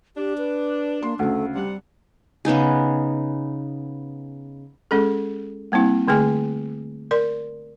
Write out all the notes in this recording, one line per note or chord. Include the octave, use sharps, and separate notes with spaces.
D4 G4
B4
A#3 C6
D2 C#3 A3
C3 G3 D4 F#5
C#3 B3 D#4 G#4
G#3 C#4 G#4 A4
G3 A#3 C4 E4
D3 A3 G#4 G#5
A#4 D5 C6